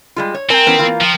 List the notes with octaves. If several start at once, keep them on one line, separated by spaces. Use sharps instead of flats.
G3 G#3 F4
C#5
C4 A#4 G5 G#5
E3 B3 C#4
E3 A#3 F4
F3